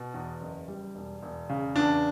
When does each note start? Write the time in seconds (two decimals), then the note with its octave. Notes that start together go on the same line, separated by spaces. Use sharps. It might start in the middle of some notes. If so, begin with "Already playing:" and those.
Already playing: B2
0.14 E2
0.41 F#1
0.68 G3
0.95 E1
1.22 E1
1.50 C#3
1.76 E2 D4